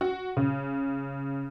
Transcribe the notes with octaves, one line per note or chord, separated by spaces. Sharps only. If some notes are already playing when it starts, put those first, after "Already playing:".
F#4
C#3